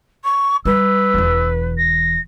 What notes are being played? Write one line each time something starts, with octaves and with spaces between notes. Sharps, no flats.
C#6
G3 B4 E6
E1 E2
A#6